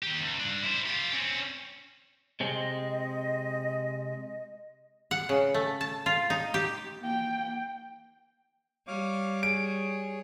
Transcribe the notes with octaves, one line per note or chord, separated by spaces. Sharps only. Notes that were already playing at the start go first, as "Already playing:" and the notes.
D#3 G4
C#2
G2 D4
E4 C5
F4 G4
C4 C#4
C3 G#3 C4 D#5
F#5
C#3
A3
A5
F4
D#4
G4
A#3 G5
G3 C#5 F5 D6
G#4 C#5 D7